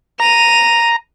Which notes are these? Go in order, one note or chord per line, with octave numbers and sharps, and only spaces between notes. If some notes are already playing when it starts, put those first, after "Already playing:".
A#5 D#7 F7